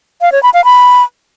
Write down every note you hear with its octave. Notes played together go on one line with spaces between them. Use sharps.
F5
C#5
B5
F5
B5